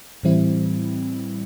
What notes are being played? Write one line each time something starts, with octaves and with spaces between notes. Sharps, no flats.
A2 E3 G3 C4 E4